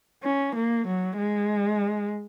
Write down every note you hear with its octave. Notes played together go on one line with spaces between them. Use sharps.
C#4
A#3
F#3
G#3